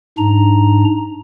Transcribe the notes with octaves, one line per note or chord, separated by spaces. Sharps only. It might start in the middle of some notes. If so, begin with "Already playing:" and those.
G#2 D4 A#5